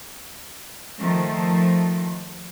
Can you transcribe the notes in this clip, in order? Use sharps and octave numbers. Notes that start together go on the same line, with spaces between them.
D#3 F3 A3